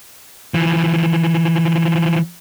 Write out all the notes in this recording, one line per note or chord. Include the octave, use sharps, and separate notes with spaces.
E3 F3